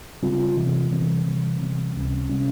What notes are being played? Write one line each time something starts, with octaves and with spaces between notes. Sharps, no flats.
C#3 G3 C4 F4
C3 E3 G3 C4
C3 E3 G3 C4
C3 E3 G3 C4
C3 E3 G3 C4
C#2 C3 G3 C#4
C3 G3 C#4